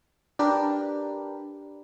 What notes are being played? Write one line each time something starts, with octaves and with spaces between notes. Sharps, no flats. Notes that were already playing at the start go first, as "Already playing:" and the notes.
D4 G4 A#4 B4